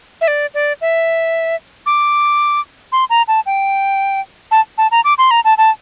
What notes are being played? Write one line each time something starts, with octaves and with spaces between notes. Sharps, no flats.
E5
D5
D5
E5
D6
C6
A#5
A5
G5
A5
A5
A#5
D6
C6
A#5
A5
A5